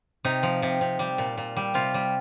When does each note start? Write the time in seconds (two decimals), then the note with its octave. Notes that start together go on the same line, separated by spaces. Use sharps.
0.25 C3 D#4
0.43 F3
0.62 C3
0.81 C3
0.99 G3
1.18 A#2
1.38 A#2
1.57 G3
1.74 C3 F4
1.94 G3